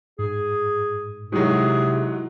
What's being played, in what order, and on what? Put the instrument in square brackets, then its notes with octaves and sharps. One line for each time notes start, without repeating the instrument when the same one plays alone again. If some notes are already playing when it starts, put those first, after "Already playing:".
[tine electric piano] G#2 [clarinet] G#4
[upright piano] G#2 D#3 F#3 [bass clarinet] C3 [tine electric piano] E4 F#4 [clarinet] G#4